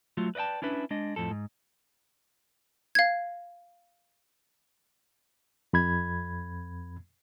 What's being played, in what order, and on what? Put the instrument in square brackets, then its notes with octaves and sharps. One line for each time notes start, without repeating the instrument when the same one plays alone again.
[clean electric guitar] F#3 A3 F4 F#4
B4 D5 D#5 G5 A5
C#4 D4 E4 B4
G#3 D4 D#5
F2 A2 F3 A4
G#2
[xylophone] F5 G#6
[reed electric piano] F2 B5 G#6